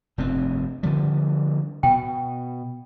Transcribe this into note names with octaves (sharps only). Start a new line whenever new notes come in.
F1 G2 C4
D3 F3 G3
B2 G5